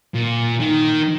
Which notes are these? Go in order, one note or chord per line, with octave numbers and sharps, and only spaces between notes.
A#2
D#3